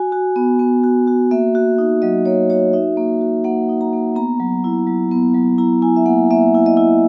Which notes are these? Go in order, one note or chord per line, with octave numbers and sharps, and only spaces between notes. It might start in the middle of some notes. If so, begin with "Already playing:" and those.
Already playing: F#4 G#5
F#4
B3
B3
F#4
F#4
A#3 E5
F#4
D#4
F#3 D#5
A#3 C#5
F#4 C#5
D#4 E5
A#3
F#4
A#3 F#5
D#4
A#5
A#3
B3 A#5
F#3
E4
F#3
B3
F#3
E4 A#5
E4 G#5
E5
A#3 F#5
A#3 E5
E4
D#5
E4